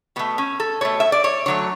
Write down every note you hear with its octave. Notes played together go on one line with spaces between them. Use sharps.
B2 A3 B3
C#4
A4
B2 A3 C#5
E5
D5
C#5
D3 F#3 A3 C#5